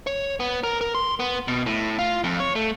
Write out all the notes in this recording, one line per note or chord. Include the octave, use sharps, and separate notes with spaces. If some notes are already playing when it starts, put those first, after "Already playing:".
C#5
B3
A#4
A#4
C6
B3
B2
A2
F4
F2
C#5
A3